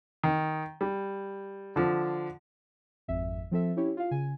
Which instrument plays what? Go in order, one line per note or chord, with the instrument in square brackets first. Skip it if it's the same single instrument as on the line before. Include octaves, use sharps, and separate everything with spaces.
[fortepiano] D#3
G3
D3 F3
[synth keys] G#1 F2 E5
F3 C4 A4 E5
C#4 E4 G4 C#5
F4 F5
C#3 G#5